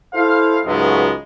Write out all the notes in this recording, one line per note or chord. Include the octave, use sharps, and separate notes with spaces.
E4 A4 C5 F5
C#2 G#2 F#3 G#3 A3 B3